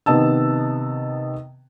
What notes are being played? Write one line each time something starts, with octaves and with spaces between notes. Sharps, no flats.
C3 D#3 B3 D#5 A5 E6